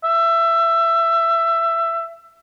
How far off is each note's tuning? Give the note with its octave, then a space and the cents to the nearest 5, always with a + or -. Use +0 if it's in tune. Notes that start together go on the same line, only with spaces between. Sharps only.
E5 +20